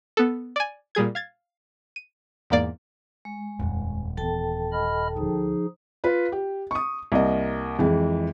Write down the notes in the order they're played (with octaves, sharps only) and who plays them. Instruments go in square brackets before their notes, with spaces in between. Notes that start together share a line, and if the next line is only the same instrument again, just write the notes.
[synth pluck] B3 A4
D5 G#5
A#2 G3 G#4 G#6
F5 G#6 A6
D#7
E2 G#2 A#3 D5
[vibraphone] G#3
[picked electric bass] D#1 [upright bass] F2 G3
[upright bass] E3 B3 [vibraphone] A4 G5 A5
[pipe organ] D#5 B5 F6
[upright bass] D2 [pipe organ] F3 D#4 G#4
[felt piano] F4 B4
G4
C#6 D#6
C2 A#3 D#5
F2 E3 G#3